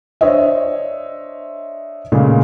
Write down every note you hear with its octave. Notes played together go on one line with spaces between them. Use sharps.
D4 C5 C#5 D#5 E5
A#2 C#3 G#3 A3